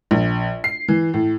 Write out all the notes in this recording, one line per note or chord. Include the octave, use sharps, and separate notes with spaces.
A#1
C7
E3
A2